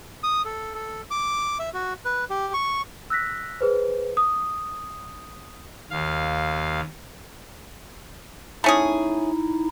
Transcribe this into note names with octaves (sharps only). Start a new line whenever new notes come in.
D#6
A4
A4
D6
E5
F#4
B4
G4
C#6
E6 F#6 A#6 B6
G#4 B4 C5
D#6
D#2 F5
A3 C#4 D#4 E4 G#4